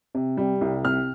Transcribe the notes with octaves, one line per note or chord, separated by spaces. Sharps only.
C3
G3
C2
C3 F6